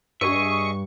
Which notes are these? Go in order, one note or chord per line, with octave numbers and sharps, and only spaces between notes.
G2 G#4 D#5 E5 C#6